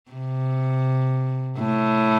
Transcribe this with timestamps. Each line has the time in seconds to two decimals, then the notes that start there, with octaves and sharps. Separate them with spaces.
0.11 C3
1.59 A2